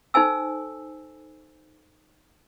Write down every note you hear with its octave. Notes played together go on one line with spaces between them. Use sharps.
D#4 A4 C5 G#5 E6